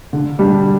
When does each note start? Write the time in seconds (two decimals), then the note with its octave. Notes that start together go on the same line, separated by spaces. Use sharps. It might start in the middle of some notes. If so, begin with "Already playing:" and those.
0.13 D3
0.39 G3 D4